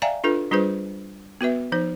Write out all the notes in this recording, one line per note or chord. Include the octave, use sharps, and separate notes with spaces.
D5 E5 F5 G5 G#5 A#5
D4 F4 A4 B4
G3 D4 F4 G#4 B4 C5
B3 F#4 B4 E5
F3 D#4 C5